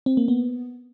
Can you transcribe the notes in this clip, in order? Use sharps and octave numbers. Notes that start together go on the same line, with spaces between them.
C4
A#3
B3